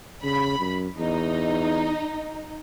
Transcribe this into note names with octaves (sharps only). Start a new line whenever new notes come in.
C#3 B5
F#2
E2 D#4